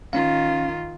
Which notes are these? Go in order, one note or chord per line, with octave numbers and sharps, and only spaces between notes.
D#3 C#4 F4 F5